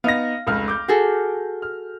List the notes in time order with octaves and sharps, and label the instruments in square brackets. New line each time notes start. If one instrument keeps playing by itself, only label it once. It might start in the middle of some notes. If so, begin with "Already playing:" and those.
[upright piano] B3 D#4 A#6 [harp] F5
[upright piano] F1 C#2 F6
D6 G6
[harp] F#4 G#4 A4
[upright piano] F6